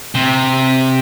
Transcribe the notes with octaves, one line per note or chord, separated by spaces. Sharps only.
C3